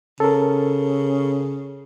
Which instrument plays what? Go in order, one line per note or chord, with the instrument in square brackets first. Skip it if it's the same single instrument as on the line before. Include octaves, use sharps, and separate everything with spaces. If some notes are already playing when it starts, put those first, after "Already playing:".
[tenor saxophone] C#3 [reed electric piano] A4 A#4